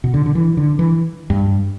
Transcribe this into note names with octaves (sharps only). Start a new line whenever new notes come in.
B2
D3
D3
E3
D3
E3
G2